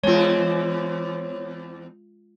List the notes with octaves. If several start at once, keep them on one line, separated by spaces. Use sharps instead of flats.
E2 G#3 C4 F4 C#5